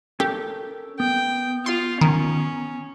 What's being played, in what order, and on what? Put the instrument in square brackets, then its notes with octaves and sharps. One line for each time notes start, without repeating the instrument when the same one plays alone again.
[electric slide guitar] C#4 A4 A#4 [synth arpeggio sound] G4
[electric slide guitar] B3 [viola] G5
[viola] F4 [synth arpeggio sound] C6
[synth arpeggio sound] D#3 [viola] C#4